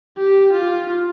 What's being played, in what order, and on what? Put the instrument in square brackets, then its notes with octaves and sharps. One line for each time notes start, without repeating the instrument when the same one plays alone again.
[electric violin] G4
F4